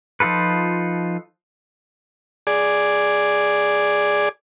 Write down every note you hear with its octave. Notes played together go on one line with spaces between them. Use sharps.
F3 D#4 F4 A4 B4
G#4 D5